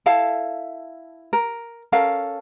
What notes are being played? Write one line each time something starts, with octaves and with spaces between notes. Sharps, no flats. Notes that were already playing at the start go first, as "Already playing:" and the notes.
E4 A4 F5 A5
A#4
C#4 A4 A#4 F5